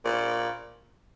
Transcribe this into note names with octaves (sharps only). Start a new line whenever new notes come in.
A#2